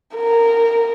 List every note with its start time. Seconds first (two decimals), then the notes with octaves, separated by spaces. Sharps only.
0.16 A#4